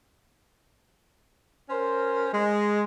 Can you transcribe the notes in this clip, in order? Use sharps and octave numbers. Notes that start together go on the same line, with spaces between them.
C#4 A#4 C5
G#3